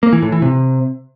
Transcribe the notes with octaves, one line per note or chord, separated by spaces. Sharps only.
A#3
E3
A2
E3
C3